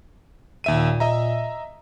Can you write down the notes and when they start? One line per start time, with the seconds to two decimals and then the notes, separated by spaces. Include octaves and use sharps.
0.64 D#2 A#2 E5 D#7
1.00 D#5 E5 A#5